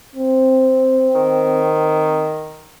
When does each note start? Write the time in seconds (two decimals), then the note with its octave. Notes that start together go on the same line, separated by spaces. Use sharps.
0.15 C4
1.15 D#3